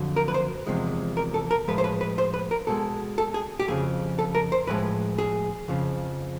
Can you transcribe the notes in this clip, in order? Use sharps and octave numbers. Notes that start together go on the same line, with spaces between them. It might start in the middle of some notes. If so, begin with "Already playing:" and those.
Already playing: F2 D3 F#3
A#4
B4
C5
E2 C3 F3 G#3
A#4
A4
A#4
A2 F3 G#3 B4
C5
B4
B4
C5
B4
A#4
B2 G#3 A4
A4
G#4
G4
F2 C#3 F3 G#4
A4
A#4
C5
A2 F3 G#3 B4
G#4
F2 C#3 F3